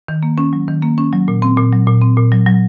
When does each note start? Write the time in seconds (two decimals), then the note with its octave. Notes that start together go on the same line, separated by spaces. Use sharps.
0.08 D#3
0.23 A#3
0.38 C#4
0.53 F#3
0.68 D#3
0.82 A#3
0.98 C#4
1.13 F#3
1.28 A#2
1.42 C4
1.57 A#2
1.72 F#3
1.87 A#2
2.02 C4
2.17 A#2
2.32 F#3
2.46 F#3